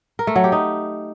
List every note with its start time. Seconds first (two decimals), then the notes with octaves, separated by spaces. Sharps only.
0.19 A#4
0.27 A3
0.36 F#3
0.44 G4
0.52 D#4